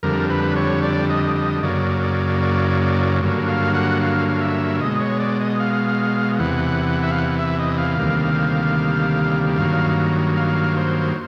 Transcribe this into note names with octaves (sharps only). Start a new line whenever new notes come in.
F2 D3 G3 A#4
B4
C#5
D5
D#5
D#5
F#2 C#3 F#3 A#3 D5
D5
D5
D5
G2 D3 F#3 A#3
F5
F#5
F5
F5
E5
B2 G#3 D#5
C#5
D5
D#5
F5
E2 C3 E3 F#5
E5
F5
F#5
E5
D#5
F5
D2 C3 D#3 G3 A#3
G2 D#3 F#3 A#3 F5
F5
C5